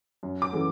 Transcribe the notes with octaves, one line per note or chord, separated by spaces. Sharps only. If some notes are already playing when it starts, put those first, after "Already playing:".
F#2
D6
C#3 E3 A3